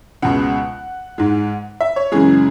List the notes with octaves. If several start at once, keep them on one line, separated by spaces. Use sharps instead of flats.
C#2 B2 G#3 F#5
G#2 G#3
E5
C#5
F#2 C#3 E3 G#3 G#4